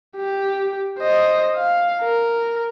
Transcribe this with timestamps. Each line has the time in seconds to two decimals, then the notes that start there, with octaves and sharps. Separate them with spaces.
0.16 G4
0.99 C5 D#5
1.56 F5
2.01 A#4